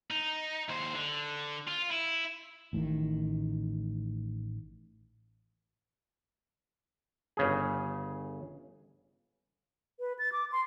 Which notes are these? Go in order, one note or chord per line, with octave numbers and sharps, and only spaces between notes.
D#4
D#2 C5
D3
F4
E4
A1 A2 C3 D#3
G1 C#3 G#4
B4
A6
D6
C6